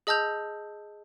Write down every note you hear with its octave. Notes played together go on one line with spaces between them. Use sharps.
G#4 D#5 A5 E6 G6 F7